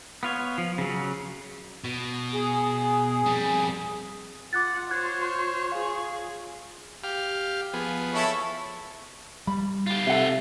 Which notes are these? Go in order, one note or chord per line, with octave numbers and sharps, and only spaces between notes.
B3 F4 C#5
F3
C#3 F#3
B2
G#4
F2 G3
F4 F#5 D6 F#6 A6
C5 C#5 F#6 G#6
G#4 F5
G4 F5
F3 B3 G#4
E4 A4 C#5
G3 B5
F4 G4
C3 A4 E5 F#5